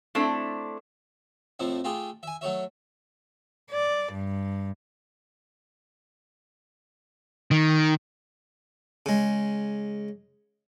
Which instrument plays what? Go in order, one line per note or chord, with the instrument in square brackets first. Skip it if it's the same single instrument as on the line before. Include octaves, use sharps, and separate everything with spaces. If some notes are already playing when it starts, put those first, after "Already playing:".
[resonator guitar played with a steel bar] A3 C4 D4 E4 A4
[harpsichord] F2 A2 F3 E4
A3 F4 G4 G#4
E5 G#5
F#3 A3 C#5 E5
[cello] D5
G2
[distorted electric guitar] D#3
[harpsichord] C#3 G#3